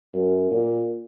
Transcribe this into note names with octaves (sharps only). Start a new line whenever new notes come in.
F#2
A#2